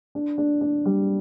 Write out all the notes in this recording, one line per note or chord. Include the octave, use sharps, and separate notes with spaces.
D4
D4
D4
G3